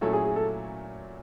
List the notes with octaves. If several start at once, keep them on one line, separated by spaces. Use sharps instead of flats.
A#2 F#3 A3 C#4 E4 A4
G#4
G#4
A4